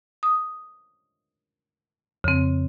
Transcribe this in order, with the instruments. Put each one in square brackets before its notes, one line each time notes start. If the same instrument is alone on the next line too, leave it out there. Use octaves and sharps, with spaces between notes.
[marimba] D#6
[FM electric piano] F2 [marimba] C#3 C4